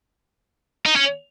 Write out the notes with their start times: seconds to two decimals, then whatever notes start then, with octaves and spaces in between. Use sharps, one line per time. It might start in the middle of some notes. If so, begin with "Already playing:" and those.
0.86 D#4
0.96 C#4